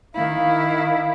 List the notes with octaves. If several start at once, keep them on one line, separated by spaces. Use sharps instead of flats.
D#3 E4 F5